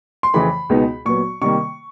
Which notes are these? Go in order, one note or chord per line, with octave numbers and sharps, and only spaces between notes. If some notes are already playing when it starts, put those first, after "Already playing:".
C6
F2 C#3 E3 A3 B5
C#2 B2 G#3 B3 D#4
A#2 F#3 B3 C#6
C3 D#3 G3 A#3 C#6